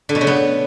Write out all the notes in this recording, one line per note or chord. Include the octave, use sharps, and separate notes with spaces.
D3
B2
C#3
B3